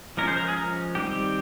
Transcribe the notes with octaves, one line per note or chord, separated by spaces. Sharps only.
F3 G#3 C#4 A#4
C5
A#4
G#4
A#4
D#3 G3 C4 G4